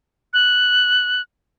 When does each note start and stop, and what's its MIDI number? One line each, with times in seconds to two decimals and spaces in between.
0.33 1.22 90